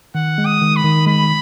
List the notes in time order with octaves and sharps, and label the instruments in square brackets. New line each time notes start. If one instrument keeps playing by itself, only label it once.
[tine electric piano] D#3 [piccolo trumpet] F#5
[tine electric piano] G#3
[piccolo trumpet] D#6
[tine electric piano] D#3
[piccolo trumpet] B5
[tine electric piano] D#3
[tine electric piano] G#3 [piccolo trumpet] B5